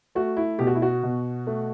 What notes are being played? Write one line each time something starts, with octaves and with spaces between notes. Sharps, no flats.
A3 F#4
E4
B2 G4
F#4
E4
F#4
B2
A3